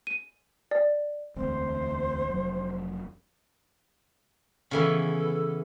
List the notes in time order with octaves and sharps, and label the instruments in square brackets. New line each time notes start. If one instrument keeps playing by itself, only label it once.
[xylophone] D#7
D5
[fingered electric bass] E1 D2 C4 [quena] C5
[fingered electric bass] F1 F#3
[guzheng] C#3 E3 B3 [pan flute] A4